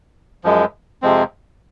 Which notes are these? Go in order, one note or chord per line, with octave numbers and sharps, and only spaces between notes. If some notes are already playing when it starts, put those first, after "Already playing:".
F#2 F3 G#3
F2 C3 F3 G#3 C4